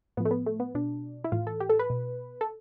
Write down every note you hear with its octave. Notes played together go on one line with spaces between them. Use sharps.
A2 F3 B3
A3
B3
A3
B3
B2 D4
E4
A2 E3 F4
A4
G4
A4
B4
B2
A4